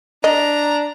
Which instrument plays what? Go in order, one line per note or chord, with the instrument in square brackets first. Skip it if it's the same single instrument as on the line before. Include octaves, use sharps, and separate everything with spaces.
[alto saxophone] D4 [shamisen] D#5 [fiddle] A#5